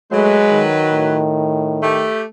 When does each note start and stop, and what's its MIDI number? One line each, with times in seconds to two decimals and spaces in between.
0.12 1.18 54
0.12 0.66 56
0.12 0.37 57
0.12 1.18 71
0.52 2.09 51
0.91 1.96 45
1.83 2.24 57
1.83 2.24 67